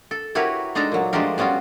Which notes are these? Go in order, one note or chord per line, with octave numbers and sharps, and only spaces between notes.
A4
E4 F#4 G4 A#4 B4 C#5
G#3 D4 D#4 A4 A#5
A#2 F#3
F3 G#3 A3 D4 G4 A#4
G3 B3 C#4 F4 F#4